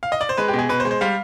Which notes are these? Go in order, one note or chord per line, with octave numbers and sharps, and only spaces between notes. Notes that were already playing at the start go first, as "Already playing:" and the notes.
F5
D#5
D5
C5
G#3 B4
G4
B2
G#4
B2 B4
C5
G#3
C5
G3 F5